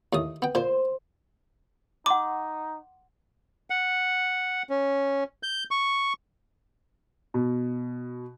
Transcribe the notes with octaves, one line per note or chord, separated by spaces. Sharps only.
D#2 A2 D#6
B3 G5
A#2 C5
D#4 F#5 C6 D6
F#5
C#4
G6
C#6
B2